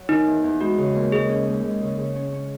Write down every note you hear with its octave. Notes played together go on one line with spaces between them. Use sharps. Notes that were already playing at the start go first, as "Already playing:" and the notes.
Already playing: F#3
D#3 D#4
E2
E2
G#3 F#4
C#3
D#2
G#3 G#4
C#4
D#2
G#3
C#3
C#3
C#4
C#4